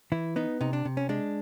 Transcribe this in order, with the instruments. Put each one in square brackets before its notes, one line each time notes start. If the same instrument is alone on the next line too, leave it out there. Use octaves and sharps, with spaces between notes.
[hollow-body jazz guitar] E3 E4
B3 D#4
C3 D#4
D4
C3
C#4
G#3 D4